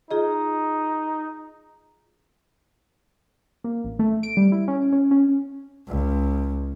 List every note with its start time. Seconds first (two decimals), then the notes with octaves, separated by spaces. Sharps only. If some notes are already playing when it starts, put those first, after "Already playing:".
0.11 D#4 F4 G#4 D#5
3.64 A#3
3.84 A1
3.99 A3
4.23 D7
4.37 G3
4.52 E4
4.68 C#4
4.92 C#4
5.11 C#4
5.88 C#2